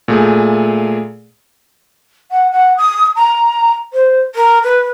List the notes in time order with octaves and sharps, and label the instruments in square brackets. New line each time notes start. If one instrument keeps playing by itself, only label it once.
[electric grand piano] A#2 A3 G#4
[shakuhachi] F#5
F#5
D#6
A#5
C5
A#4
B4